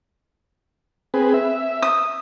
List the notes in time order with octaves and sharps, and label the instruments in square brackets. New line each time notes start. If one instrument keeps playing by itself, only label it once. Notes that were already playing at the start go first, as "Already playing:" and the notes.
[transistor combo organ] C4 G#4 B4
E5
[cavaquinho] D#6